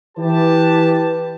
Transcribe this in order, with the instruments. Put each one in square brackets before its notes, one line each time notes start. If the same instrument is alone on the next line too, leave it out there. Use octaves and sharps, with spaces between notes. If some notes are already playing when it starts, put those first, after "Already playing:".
[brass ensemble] E3 G4 B4 A5